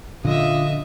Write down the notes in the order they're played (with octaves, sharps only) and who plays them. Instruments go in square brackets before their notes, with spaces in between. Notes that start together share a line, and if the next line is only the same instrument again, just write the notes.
[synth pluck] A#2 F3 C#4 [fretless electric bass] D3 [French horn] F4 [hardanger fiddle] D#5 E5